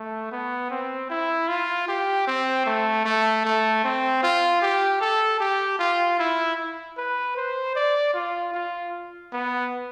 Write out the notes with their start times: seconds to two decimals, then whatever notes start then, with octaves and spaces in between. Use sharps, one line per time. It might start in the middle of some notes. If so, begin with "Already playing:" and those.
Already playing: A3
0.32 B3
0.70 C4
1.10 E4
1.48 F4
1.88 G4
2.27 C4
2.66 A3
3.05 A3
3.45 A3
3.84 C4
4.23 F4
4.62 G4
5.01 A4
5.40 G4
5.79 F4
6.19 E4
6.98 B4
7.37 C5
7.76 D5
8.14 F4
8.54 F4
9.32 B3